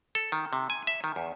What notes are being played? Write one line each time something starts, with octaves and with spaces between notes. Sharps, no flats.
A4
D#3
C3
G#5
E5
D#3
E2